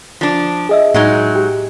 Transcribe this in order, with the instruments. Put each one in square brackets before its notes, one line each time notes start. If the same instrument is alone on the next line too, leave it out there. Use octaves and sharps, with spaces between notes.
[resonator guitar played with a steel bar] F3 D4
[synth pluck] G#4 D#5 E5
[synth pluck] A2 [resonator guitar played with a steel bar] F#3 G#3 D#4
[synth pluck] G4